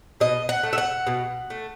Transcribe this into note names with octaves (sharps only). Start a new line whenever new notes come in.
B2 D#5
F#5
A3
E5
F#5
B2
A3